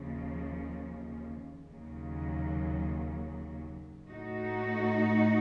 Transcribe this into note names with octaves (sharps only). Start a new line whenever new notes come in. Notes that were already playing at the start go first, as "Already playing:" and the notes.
Already playing: D#2 C#3 F3
D#2 C#3 F#3
A2 A3 D#4 F#4